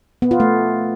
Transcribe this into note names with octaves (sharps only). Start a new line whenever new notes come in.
B3
F4
A3